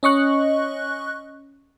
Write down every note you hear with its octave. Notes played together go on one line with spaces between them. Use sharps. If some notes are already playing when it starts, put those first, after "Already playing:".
C#4 D#5 C#6 F#6